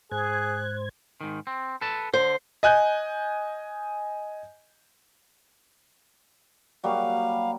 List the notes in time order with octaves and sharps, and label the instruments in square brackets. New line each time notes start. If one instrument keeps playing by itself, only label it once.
[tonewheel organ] G#2 C5 G#6 [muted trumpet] G#4 [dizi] F#6
[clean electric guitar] G#2 D#3
C4
A4 B4 A5
[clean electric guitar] D3 [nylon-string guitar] C5
[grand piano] D#5 G#5 F#6 G6
[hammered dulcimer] F#3 G3 A#3 [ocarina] F5